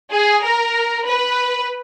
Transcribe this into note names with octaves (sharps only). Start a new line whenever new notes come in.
G#4
A#4
B4